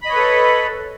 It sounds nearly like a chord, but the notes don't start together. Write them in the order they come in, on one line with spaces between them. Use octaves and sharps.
B5 D#5 C#5 B4 A4